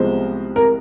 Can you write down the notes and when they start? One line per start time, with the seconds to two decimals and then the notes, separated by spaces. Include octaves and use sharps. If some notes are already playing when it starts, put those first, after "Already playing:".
Already playing: C2 C3 F3 G#3 B3 C5
0.56 A#4